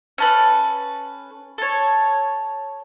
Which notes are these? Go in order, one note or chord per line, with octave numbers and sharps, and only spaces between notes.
C#4 A4 B4
A4 C#5